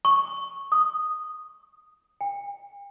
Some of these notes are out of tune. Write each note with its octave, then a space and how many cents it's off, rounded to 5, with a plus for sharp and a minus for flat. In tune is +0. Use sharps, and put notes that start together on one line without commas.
C#6 -10
D#6 -5
G5 +45